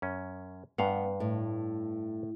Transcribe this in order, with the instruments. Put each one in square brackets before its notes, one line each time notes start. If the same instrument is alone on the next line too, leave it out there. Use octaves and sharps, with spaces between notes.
[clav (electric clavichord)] F#2 C#4
[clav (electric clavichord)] G2 F5 F#5 [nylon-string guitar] B3
[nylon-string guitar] A2